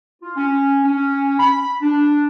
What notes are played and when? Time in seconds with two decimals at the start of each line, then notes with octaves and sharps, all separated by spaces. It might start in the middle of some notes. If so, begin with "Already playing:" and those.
0.23 F4
0.36 C#4
0.84 C#4
1.39 B5
1.82 D4